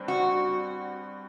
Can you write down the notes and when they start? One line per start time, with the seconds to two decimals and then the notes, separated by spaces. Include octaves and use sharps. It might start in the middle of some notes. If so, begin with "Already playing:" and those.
Already playing: G2 C4
0.08 F#4